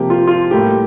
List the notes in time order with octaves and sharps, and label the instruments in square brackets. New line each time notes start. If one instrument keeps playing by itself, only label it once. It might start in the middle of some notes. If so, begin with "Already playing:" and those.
Already playing: [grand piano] C3 F3 A#3 G4
F4
F4
A2 G3 A#3 G4